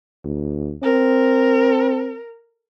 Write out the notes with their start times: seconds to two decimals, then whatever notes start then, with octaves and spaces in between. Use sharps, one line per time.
0.25 D2
0.83 C4 A#4